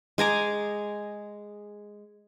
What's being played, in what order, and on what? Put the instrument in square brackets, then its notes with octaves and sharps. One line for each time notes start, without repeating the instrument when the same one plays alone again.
[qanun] G#3 G#5 A#5 D6